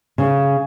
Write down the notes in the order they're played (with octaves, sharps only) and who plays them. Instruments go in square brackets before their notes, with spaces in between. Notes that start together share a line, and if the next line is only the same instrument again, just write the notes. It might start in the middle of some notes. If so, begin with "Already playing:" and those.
[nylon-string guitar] C#3